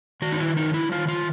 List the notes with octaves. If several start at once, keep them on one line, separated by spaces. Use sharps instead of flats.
D#3 F#4
D#4
E4
F#3 D#4
E4
D#3 F4
F4